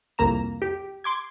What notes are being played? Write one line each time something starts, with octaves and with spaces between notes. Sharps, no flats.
C2 F2 A#3 A#5 E7
G4
C6 D6 G#6